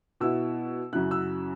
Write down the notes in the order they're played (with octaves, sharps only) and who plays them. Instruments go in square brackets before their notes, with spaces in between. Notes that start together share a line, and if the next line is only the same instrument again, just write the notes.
[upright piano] B2 B3 E4 E6
F#2 C#3 F#3 E4 F#6
E6